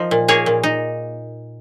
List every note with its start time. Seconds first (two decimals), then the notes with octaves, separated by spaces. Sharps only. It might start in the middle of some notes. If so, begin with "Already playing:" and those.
Already playing: F3 D#4
0.11 A#2
0.28 A#3 G#4 C#5
0.46 A#2
0.63 D#4